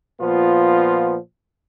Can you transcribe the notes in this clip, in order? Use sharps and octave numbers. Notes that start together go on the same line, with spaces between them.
A#2 F3 B3 F4